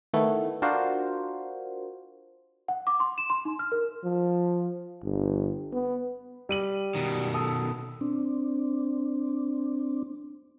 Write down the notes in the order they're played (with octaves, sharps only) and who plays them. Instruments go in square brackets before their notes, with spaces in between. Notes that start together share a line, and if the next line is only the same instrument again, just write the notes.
[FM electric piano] D#3 A3 B3 E4
D4 F4 F#4 A#4 C5
[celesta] F#5
D6
C6
E7
C6
D#4
F6
A#4
[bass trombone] F3
G1
B3
[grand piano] G3 D#7 F#7
[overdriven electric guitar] B2 D#3
[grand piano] A4 D#6
[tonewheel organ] C4 D4